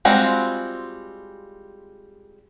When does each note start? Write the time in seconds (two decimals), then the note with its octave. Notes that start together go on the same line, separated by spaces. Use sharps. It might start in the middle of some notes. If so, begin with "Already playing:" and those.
0.05 G3 G#3 C4 F4 F#4